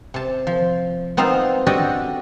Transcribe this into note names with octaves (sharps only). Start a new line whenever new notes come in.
C3 A5
F3
B3 C4 D#4 F4 F5
D4 F#4 G4 A4 D5 D#5